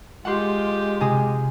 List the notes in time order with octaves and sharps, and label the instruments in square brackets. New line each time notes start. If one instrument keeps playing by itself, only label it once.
[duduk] G#3 [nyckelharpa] F4 G4 [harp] F#5 C6
[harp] C3 G#4 D#6